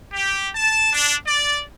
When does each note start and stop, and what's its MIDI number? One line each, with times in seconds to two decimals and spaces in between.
0.14 0.50 67
0.55 0.93 81
0.93 1.15 62
1.27 1.63 74